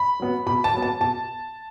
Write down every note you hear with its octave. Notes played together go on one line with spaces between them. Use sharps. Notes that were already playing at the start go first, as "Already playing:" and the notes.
Already playing: B5
F#3 B3
B2 B5
A5
F#3 B3
A5
B2 A5